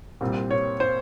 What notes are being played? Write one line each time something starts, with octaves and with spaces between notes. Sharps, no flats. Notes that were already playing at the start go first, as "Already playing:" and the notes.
C2 A#2 G3 C4
C#5
C5